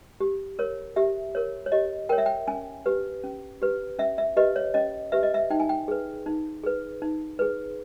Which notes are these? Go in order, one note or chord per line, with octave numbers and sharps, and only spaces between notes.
G4
A#4 C#5
G4 E5
A#4 C#5
C#5
G4 D#5
A#4 C#5 G5
E5
G5
C#4 G#5
G4 B4
C#4
G4 B4
C#4 E5
E5
G4 B4 D#5
C#5
C#4 D#5
G4 B4 E5
D#5
E5
D#4 G5
G#5
G5
G#4 B4
D#4
G#4 B4
D#4
G#4 B4